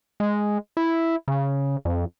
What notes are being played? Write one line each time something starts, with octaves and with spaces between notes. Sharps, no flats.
G#3
E4
C#3
F2